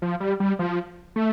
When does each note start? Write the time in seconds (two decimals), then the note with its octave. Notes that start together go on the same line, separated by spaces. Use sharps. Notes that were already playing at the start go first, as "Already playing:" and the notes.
0.02 F3
0.20 G3
0.40 G3
0.59 F3
1.16 A3